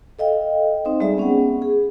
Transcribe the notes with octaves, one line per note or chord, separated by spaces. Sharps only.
A4 D#5 F5 G5
C4 D#4 C5
G3 G#3 D#4 G#4 D5 E5
B3 C#4 G#4 F#5
G#4